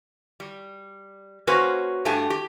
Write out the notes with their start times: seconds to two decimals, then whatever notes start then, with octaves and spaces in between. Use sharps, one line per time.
0.40 G3
1.47 A#3 C#4 F#4 B4 C5 G#5
2.05 G2 A3 D4 G4 G#5
2.30 G4